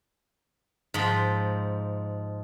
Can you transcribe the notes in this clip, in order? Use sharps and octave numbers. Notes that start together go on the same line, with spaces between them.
G#2 F3